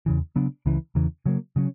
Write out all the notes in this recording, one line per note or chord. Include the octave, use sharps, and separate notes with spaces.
E2 C#3 E3
C#3 F#3 B3 D4
C#2 C#3 E3
E2 C#3 E3
C#3 F#3 A#3
C#3 F#3 C#4